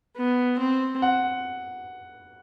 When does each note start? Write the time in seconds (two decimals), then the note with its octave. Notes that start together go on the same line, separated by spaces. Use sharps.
0.17 B3
0.60 C4
1.02 F#5